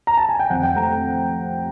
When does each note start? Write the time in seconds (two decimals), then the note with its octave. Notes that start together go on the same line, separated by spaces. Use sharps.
0.07 A#5
0.18 A5
0.29 G#5
0.40 G5
0.50 F2 F#5
0.63 G5
0.76 A3 A#5